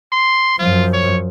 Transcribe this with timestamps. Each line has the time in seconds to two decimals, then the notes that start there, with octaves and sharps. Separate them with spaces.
0.12 C6
0.59 F#2 F3 F4
0.93 C#5